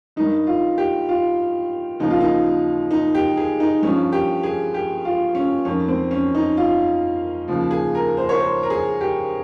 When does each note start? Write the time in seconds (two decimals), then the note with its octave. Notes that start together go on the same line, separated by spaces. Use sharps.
0.16 G2 D#3 D#4
0.47 F4
0.78 G4
1.09 F4
1.99 D#2 C#3 F3 D#4
2.10 F4
2.21 D#4
2.91 D#4
3.15 G4
3.37 G#4
3.60 D#4
3.82 G2 F3 C#4
4.12 G4
4.43 G#4
4.74 G4
5.05 F4
5.35 C#4
5.65 F2 D#3 C#4
5.88 C4
6.11 C#4
6.35 D#4
6.57 F4
7.48 D#2 C#3 F3
7.71 G#4
7.95 A#4
8.17 C5
8.29 C#5
8.39 C5
8.63 A#4
8.70 G#4
9.01 G4